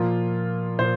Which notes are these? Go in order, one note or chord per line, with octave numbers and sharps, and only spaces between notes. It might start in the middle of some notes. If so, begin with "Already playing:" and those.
Already playing: A#2 F3 A#3 F4
A#2 C5